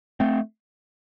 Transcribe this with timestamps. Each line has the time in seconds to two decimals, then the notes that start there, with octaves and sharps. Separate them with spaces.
0.20 A3 C4